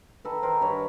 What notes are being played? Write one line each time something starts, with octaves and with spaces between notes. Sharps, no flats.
D#3 A4 B4
D#3 A#4 C5
G2 B4 C#5